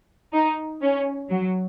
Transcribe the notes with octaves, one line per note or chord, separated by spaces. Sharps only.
D#4
C#4
F#3